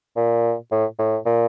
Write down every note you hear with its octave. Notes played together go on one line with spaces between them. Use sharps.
A#2
A2
A2
A#2